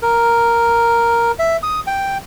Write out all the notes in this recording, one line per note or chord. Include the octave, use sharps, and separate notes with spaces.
A#4
E5
D#6
G5